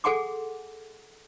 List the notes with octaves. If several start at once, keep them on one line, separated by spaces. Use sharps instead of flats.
G#4 A4 F#5 G#5 C6 D6